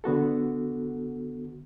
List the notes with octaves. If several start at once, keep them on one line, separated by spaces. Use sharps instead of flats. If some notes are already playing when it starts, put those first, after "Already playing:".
D3 B3 F#4 A4